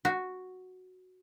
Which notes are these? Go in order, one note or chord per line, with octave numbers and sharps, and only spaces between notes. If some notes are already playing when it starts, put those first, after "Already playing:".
F#4